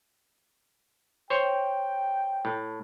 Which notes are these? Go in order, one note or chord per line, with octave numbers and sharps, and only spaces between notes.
C5 C#5 G5
A2